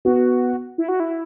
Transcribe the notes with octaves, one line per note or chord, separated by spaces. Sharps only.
B3 F#4
E4
F#4
E4